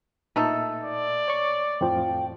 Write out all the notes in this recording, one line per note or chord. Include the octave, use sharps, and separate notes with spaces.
A#2 A3 D#4 A4
D5
C#5 C#6
F2 A2 F3 G5